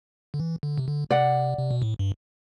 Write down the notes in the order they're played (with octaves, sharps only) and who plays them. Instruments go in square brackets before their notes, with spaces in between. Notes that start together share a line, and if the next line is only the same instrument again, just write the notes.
[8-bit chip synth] D3
E3
D3
C3
D3
[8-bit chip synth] C3 [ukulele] D5 F#5
[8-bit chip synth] C3
B2
A2
G2